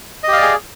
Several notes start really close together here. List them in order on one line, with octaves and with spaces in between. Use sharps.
D#5 G4 F5 D5 G#4